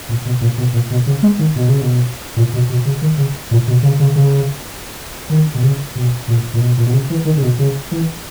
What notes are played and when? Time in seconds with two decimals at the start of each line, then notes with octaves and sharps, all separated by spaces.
0.09 A#2
0.25 B2
0.41 A#2
0.58 B2
0.73 A#2
0.90 B2
1.07 C#3
1.22 G#3
1.39 D#3
1.56 B2
1.68 C#3
1.81 B2
2.36 A#2
2.53 B2
2.69 B2
2.85 C#3
3.02 D#3
3.18 C#3
3.51 A#2
3.67 B2
3.83 C#3
4.00 C#3
4.16 C#3
5.30 D#3
5.54 B2
5.63 C#3
5.95 B2
6.28 A#2
6.54 A#2
6.60 B2
6.77 A#2
6.86 B2
6.93 C#3
7.10 E3
7.25 D#3
7.37 C#3
7.42 B2
7.59 C#3
7.91 E3